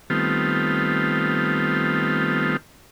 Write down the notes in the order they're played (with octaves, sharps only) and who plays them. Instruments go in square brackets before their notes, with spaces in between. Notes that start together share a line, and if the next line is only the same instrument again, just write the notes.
[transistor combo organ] D#3 G3 A3 B3 C4 F4